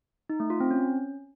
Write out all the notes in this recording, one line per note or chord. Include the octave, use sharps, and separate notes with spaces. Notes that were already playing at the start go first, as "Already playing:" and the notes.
D#4
A3
F4
C4
C#4